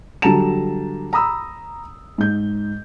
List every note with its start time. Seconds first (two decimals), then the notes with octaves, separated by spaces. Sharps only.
0.22 D3 F#3 G3 A5 A#5 E7
1.13 A#5 B5 D#6 E6
2.18 G#2 G6